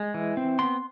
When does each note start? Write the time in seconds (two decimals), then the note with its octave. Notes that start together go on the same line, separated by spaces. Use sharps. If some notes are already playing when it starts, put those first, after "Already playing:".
Already playing: G#3
0.14 E3
0.37 C4
0.59 B3 C6